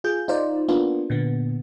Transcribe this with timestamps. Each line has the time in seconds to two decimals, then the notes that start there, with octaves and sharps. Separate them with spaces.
0.04 F4 G#4 G6
0.28 D#4 F4 C5 D5
0.68 A#3 B3 D4 F4
1.10 A#2 D3 B3